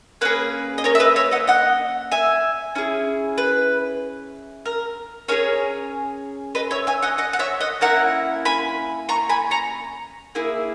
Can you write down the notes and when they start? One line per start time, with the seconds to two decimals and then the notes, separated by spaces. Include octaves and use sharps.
0.21 A#3 C#4 G#4 B4
0.78 D#5
0.84 A#4 C#5
0.95 E5
1.00 B4 D#5
1.16 C#5 E5
1.31 D#5 F#5
1.47 D#5 F#5
2.12 E5 G#5
2.75 C#4 E4 G#4
3.38 B4
4.66 A#4
5.28 C#4 E4 G#4 A#4 C#5
6.55 B4 D#5
6.71 C#5 E5
6.87 E5 G#5
7.02 D#5 F#5
7.18 D#5 F#5
7.33 F#5
7.39 C#5 E5
7.61 D#5 F#5
7.81 A#3 C#4 E4 F#5 A#5
8.45 G#5 B5
9.09 A#5 C#6
9.29 G#5 B5
9.51 A#5 C#6
10.35 A#3 E4 G#4